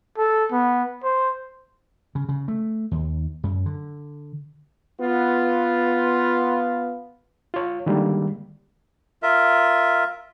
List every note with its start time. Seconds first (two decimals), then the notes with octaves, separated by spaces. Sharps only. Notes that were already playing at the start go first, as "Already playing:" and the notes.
0.18 A4
0.52 B3
1.04 C5
2.15 C#3
2.29 C#3
2.48 A3
2.91 D#2
3.44 F#2
3.66 D3
4.99 B3 F4
7.54 F4 C#5
7.86 D3 D#3 G3 G#3 A#3
9.23 F4 A#4 E5